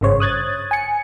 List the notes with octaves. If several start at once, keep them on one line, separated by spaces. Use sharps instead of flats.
G#1 G2 C#3 C5 C#5
D#6 F#6 G#6 A6
G#5 C#7